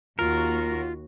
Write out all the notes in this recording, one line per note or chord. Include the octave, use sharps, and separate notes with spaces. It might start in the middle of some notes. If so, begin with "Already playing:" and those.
D#2 F4 F#4 A#4